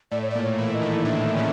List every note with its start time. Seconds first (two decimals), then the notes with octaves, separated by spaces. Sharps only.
0.11 A2 A3 D5
0.22 C#5
0.31 A3 D5
0.35 A#2 A#3
0.42 C#5
0.58 E3 E4
0.73 D#5
0.82 D#3 D#4
1.05 D3 D4 E5
1.36 C#3 C#4